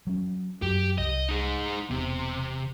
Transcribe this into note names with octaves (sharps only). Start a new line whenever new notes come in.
F#3 C#4
F#2 F#3 G4
C2 D#5
D#4 G#4
E1 C3 B3